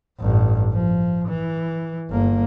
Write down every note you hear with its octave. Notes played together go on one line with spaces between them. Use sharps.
A1 G2
F3
E3
G1 A#3